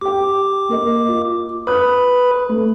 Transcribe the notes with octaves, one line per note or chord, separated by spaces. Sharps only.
G4 G5 D6
A#3 A#4 D#5
F4
B4 B5 D#6 F#6
A3